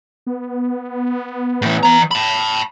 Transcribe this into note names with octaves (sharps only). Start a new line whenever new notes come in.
B3
A2 E3
E3 A#5
A5 B5